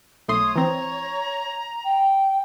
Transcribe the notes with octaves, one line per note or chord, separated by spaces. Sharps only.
B1 A3 C#5 C6 D#6
E3 C4 A#5
G5